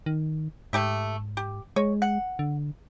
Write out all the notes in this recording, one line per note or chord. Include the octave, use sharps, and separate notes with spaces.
D#3
G#2 A3 G4 E5
G4
G#3 C#5
F#5
D3